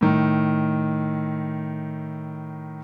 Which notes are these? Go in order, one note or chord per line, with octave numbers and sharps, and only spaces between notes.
A2 D#3